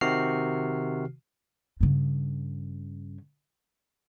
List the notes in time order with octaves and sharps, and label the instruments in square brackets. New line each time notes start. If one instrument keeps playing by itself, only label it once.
[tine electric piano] C3 D#3 F#4 F6 C7
[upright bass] G2 C#3